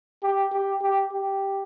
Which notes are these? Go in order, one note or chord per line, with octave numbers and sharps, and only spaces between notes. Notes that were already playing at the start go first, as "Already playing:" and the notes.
G4
G4
G4
G4